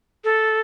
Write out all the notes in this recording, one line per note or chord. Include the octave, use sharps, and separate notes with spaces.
A4